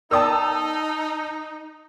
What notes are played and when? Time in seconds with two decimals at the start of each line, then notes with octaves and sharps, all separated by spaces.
0.11 D#4 A#4 D5 G5 A5 D#6 E6